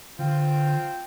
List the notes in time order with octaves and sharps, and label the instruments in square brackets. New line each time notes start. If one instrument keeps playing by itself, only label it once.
[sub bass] D3 [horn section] C4 G5 [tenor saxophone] F4